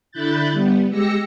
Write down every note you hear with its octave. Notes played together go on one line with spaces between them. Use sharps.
D3 E4 B5 F#6 G6 A6
G3 B3
G#3 G4 E6 A#6 C#7